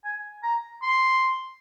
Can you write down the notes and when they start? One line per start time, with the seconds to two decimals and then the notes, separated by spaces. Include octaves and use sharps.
0.04 G#5
0.43 A#5
0.82 C6